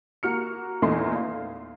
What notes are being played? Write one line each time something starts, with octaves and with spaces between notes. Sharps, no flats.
A#3 F#4 F6 C#7
E2 A#2 A3 D#4 C6 C7
F5